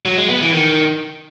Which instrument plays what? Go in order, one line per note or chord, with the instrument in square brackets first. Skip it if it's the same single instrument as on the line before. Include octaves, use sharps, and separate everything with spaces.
[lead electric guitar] F#3
G#3
B3
E3
D#3